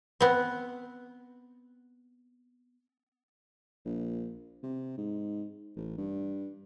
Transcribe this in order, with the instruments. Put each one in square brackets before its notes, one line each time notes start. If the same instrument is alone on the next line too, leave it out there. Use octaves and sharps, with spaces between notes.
[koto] B3 C4
[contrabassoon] A#1
C3
G#2
A1
G2